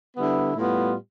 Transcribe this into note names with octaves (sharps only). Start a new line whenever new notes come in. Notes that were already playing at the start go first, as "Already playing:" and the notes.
D3 G3 B3 E4
A2 G3 B3 F4